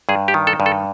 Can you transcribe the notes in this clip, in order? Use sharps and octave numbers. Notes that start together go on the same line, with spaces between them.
G2 G#4
G4
D#3
A4
G2
A4